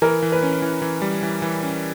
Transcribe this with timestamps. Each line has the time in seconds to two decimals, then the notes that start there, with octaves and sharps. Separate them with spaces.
0.02 E3 A#4
0.22 E3
0.32 B4
0.43 C#4
0.62 E3
0.82 E3
1.02 G3
1.23 E3
1.42 E3
1.63 C#4